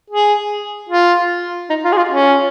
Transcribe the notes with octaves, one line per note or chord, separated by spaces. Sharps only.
G#4
F4
D#4
F4
G#4
F4
C#4